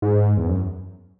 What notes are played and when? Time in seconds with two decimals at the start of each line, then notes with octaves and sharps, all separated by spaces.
0.02 G#2
0.37 E2
0.49 F#2